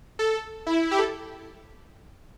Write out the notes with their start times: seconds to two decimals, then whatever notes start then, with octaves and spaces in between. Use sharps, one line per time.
0.19 A4
0.67 E4
0.83 E4
0.91 G4
0.99 A4